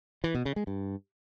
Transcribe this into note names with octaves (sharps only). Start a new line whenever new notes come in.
E3
B2
C#3
G#3
G2